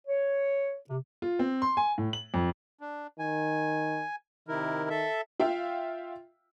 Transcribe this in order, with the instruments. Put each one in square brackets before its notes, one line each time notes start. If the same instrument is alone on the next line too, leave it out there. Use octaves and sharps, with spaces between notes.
[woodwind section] C#5
C3
[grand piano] F4
C4
C6
G#5
A2
F#7
F2
[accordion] D4
[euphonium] D#3 [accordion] G#5
[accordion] C3 E4 A#4 [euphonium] D#3
[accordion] A4 E5
[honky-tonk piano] F4 E5 F5 G5